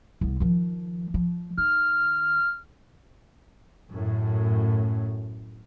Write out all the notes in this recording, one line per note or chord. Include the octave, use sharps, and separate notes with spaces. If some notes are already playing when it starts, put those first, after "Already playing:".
C2 B3
D#3 F3
F3
D#3 F6
F#2 A2